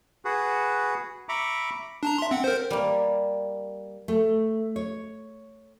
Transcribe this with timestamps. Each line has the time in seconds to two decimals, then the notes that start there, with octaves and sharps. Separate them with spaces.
0.25 F#4 G#4 B4
1.29 E5 A#5 B5 C#6 D6
2.03 D4 A5 A#5
2.18 E5 C6
2.31 C4 F#5
2.44 A#4 C5
2.70 G3 A#3
4.08 A3
4.76 C#5